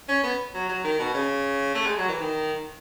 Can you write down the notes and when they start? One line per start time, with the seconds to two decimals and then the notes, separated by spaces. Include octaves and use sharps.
0.09 C#4
0.24 B3
0.54 F#3
0.69 F#3
0.84 D#3
0.99 B2
1.14 C#3
1.75 A3
1.87 G#3
1.97 F#3
2.09 E3
2.20 D#3